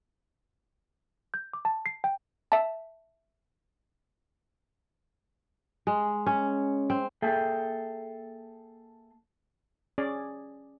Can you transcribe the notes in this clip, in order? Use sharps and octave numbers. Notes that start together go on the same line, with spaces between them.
G6
D6
A5
C7
G5
E5 A5
G#3
C#4
C4
A#3 G#4 A4 E5 G5
C#4 G#4 D5